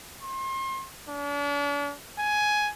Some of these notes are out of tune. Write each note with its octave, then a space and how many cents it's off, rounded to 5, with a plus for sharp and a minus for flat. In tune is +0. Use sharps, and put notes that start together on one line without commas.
C6 +35
D4 -40
G#5 +10